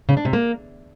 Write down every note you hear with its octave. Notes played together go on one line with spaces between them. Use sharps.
C#3
D4
C3
A#3